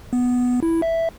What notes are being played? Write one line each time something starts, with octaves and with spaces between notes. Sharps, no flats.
B3
E4
E5